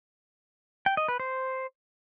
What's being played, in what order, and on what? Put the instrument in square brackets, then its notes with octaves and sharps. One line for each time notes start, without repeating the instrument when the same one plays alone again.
[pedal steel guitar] G5
D#5
B4
C5